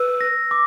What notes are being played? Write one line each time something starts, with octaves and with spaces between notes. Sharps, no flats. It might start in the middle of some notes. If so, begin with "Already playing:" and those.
Already playing: B4 E6
A#6
D6